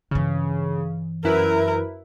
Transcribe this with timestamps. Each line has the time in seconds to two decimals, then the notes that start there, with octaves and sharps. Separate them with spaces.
0.11 G2 C#3 E3
1.24 F#2 E4 A#4 B4